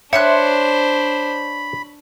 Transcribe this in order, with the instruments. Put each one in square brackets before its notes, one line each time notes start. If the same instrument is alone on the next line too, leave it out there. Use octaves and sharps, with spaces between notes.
[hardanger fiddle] D4 C5 [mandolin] C#5 C6 F#6 [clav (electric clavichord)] E5 [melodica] B5